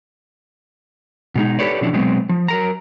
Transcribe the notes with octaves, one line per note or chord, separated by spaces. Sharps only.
B2 G#3 D#4
G4 A4 B4 C#5 D5
B2 E3 F3 C#4 D4 E4
B2 F#3 G#3 B3 C4
F3
F#3 A#4 A#5